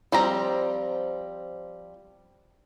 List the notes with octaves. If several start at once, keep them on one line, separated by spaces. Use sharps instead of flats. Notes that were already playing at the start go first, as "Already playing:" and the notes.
F3 G3 C4 A#5